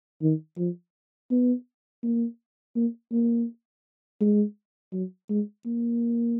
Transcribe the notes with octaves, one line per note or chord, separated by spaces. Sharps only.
D#3
F3
B3
A#3
A#3
A#3
G#3
F#3
G#3
A#3